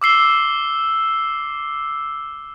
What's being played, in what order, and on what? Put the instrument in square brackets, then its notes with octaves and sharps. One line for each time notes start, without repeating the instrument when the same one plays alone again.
[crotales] D6 E6 C7 G7